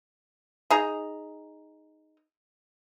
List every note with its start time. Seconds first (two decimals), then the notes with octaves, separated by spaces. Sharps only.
0.70 D#4 G#4 A#5